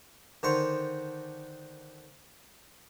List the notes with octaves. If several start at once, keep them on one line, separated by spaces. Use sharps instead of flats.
D3 D#3 C5 C#6